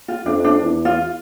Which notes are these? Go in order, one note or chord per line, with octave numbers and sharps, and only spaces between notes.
F4
F2 D4
D4
E2
F4